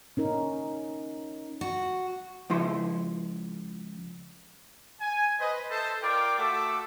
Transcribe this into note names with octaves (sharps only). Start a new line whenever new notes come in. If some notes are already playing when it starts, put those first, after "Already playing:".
C#4 D#4 A#4
F#4
C#2 F3 E4 C6
G#5
B4 C5 D#5
A4 C5 D#5 E5 A5
F4 A#4 D5 G5 D6
A3 F#4 A4 E5 F#5 D6